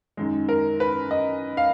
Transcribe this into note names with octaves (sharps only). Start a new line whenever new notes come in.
F#2 D#3 G#3
A#4
B4
D#5
F5